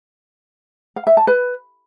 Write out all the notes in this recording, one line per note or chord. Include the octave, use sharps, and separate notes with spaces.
F5
E5
A5
B4